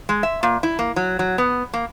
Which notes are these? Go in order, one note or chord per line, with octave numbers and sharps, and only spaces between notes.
G#3
E5
A#2
E4
A#3
F#3
F#3
B3
A#3